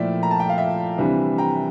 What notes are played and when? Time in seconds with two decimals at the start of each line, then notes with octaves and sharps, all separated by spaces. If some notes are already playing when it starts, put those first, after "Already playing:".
Already playing: A#2 F3 A3 E4 D5 E5 G5
0.23 A#5
0.31 A5
0.40 G5
0.49 F5
0.58 E5
0.98 C3 E3 G3 D4
1.38 G5 A#5